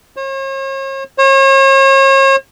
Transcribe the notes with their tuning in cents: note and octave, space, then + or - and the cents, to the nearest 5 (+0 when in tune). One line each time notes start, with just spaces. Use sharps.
C#5 -45
C#5 -40